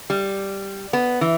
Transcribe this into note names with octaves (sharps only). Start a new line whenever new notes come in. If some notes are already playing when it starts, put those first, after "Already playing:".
G3
B3
E3